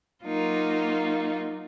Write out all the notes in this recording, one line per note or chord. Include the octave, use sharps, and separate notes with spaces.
F#3 A#3 D#4 F4